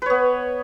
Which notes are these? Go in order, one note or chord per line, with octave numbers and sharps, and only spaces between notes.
B3 B4 C#5